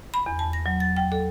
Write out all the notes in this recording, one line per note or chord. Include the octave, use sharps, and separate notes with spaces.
B5
E2
A5
A#6
F#3
A6
G5
A4